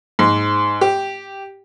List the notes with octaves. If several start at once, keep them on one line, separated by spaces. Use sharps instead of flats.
G#2
G4